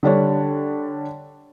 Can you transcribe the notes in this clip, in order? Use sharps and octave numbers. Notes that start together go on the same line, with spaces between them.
D3 G3 D4 C#5